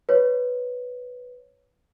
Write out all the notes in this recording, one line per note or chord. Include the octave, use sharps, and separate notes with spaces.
B4 C#5